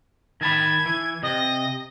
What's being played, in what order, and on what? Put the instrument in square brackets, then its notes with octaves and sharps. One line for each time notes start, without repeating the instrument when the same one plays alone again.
[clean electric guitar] D#3 A5 B5 [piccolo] G#6
[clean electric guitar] E3
[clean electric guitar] C3 [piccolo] D#5